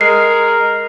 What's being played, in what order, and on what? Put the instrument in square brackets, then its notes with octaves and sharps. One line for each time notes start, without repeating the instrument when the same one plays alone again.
[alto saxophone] G#3 [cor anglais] A#4 [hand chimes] C7